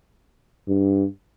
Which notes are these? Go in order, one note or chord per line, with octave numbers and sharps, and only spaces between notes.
G2